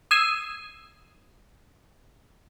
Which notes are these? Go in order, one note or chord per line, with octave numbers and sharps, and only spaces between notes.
D#6 E6 G#6 C7